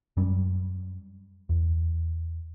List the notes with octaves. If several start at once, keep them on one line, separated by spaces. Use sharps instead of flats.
F#2 F#3 G3 C#4
E2